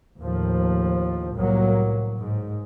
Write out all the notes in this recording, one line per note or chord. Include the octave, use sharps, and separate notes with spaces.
D#2 A2 F3
C2 A2 F#3 A#3
G#2